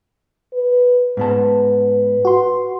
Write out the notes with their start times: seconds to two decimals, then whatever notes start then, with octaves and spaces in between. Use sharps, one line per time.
0.53 B4
1.17 G#2 B3 B4 A5
2.25 F#4 C6